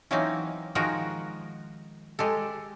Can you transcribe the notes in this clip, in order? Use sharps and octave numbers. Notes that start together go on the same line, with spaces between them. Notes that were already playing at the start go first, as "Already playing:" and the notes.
E3 F#3 A#3 C4 C#4 D#4
D#3 F3 G#3 D#4 F#4 A#4
G#3 G4 A4